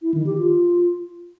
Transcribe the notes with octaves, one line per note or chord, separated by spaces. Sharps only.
E4
D#3
G4
F4